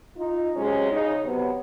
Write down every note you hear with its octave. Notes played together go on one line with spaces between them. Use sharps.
D#4 F4
C3 F#3 G#3 C#4
C#3 D#4
C3 F#3 B3